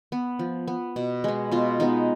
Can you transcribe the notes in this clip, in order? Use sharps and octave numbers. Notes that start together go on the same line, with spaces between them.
B3
F3
B3
B2
G#3 B3
B2 F4
G#3 B3 D#4